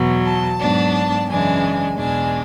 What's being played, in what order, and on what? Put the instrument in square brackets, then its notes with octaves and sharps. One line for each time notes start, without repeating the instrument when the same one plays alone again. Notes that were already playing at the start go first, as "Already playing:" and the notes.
Already playing: [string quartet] E2 B2 F#3
A5
G#2 F#3 B3 D4
A5
F#2 C#3 E3 G#3 D4 G#5
E2 B2 G#3 D4 G#5